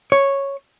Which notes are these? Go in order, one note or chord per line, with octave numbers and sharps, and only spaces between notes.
C#5